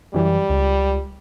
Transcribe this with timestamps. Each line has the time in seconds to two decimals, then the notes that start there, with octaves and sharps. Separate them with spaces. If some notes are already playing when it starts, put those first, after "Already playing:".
0.14 F#2 E3 G3
0.50 C#2